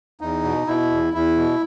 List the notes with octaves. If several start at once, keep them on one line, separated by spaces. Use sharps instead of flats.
E2 D#4
B2
B2 E4
E2
E2 E4
B2